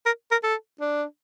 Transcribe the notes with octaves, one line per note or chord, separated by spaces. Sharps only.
A#4
A#4
A4
D4